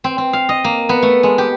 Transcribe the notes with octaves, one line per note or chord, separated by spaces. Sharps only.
C4
C4
F5
D#5
A#3
B3
A3
G#3
G4